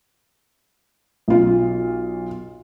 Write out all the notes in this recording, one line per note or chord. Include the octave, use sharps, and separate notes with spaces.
B1 F4